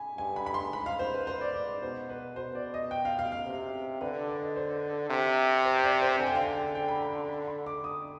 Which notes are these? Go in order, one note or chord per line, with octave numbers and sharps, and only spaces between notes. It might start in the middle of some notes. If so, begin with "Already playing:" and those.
Already playing: G#5 B5
G2 G#5
B5
B5
C6
G#2 B5
F5
C5
B4
C5
D5
D5
D5
B2 C5
B4
B2 C5
D5
D#5
G5
F5
F5
F5
C3
D3 B4
D5
D#5
C5
C3
C5
D5
C5
D3 G#5
G5
F5
G5
G5
B5
B5
C6
B5
C6
D6
D#6